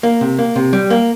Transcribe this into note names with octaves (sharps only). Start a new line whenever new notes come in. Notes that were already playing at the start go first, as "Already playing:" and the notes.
A#3
C3
A#3
C3
G3
A#3